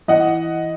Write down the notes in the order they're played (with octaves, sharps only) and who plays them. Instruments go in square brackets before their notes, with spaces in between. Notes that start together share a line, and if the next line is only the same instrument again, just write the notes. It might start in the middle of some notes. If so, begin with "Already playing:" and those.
[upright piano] E3 D#5 F#5